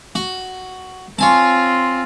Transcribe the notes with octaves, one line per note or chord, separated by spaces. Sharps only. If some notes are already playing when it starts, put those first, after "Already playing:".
F#4
C4 F4 C#5 G#5 A5